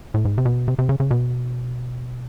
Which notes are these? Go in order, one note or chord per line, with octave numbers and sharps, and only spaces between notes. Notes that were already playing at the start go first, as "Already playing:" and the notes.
A2
G#2
C3
B2
C3
C3
C#3
C#3
B2